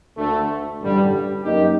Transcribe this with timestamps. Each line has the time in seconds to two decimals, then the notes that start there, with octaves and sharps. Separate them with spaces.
0.18 D2 D3 A3
0.80 A1 G2 D3 G3 D4
1.44 F#2 F#3 A#3 D#4 G4